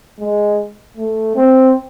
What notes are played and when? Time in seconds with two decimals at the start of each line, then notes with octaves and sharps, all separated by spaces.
0.20 G#3
0.96 A3
1.35 C4